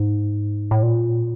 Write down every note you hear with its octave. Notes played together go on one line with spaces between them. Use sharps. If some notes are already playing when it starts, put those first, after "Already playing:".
Already playing: G#2
A2
A#2